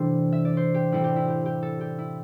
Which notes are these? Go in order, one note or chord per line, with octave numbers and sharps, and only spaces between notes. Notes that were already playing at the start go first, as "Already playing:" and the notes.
Already playing: C3 E3 G3 D4 G4 A4 C5
E5
D5
C5
G4
A2 G3 C4 E4
G4
E4
G4
G4
A4
G4
E4